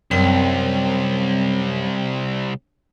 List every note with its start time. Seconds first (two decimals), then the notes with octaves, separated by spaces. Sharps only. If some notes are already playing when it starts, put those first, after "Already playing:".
0.11 C2 F#2 G3 C4 G5